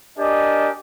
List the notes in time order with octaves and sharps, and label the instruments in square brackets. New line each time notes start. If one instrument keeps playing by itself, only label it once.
[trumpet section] D4 G4 A#4 D5 D#5 G#5